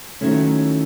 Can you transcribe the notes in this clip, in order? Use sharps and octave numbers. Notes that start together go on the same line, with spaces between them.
D#3 F#3 A3 C#4 E4